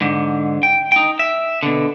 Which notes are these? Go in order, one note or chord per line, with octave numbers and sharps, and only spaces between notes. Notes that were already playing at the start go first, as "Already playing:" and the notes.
G#2 D3
G5
D#4 G5
E5
B2 D3